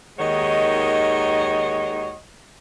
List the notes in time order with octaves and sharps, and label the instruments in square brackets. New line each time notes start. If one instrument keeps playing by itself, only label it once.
[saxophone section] D#2 D#3 G#3 F#4 C#5 D#5